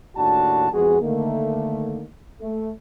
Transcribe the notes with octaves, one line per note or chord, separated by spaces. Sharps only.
D#2 A2 D4 F#4 A5
F2 G#3 B3 F#4 G#4
D3 D#3 A3 A#3
A3